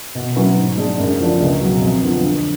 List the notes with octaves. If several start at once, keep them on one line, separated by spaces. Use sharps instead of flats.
B2
F#3 C#4 F#4 B4
G#2
G#3 D4
F#2
D3 F3 B3 D4
C#2
B2 F#3
F2
D3 F3 B3
D3